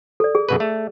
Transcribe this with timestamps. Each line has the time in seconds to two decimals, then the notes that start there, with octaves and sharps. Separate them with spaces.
0.20 A4 D5
0.35 G#4
0.49 F#2 B2 B4
0.60 A3